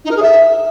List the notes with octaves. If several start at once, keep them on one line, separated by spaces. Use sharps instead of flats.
D#4
A#4
G#4
E5